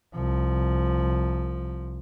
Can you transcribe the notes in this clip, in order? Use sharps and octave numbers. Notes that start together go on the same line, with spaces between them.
C2 F3